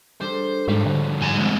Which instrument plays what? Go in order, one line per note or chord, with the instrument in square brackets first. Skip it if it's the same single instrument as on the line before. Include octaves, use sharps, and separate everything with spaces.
[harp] G3 D4 A4 [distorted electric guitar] C5
[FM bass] G#2 [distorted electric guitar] F3 G3 [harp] G4 C#5
[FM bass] D3 [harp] F#5
[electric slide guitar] G#2 G#5 A#5
G#3 B3 C4